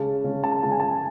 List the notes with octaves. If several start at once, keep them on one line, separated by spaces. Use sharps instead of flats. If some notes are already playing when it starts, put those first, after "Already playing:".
Already playing: C#3 G#3 C#4 A5
C#3 G#3 C#4
A5
C#3 G#3 C#4 A5
G#5
A5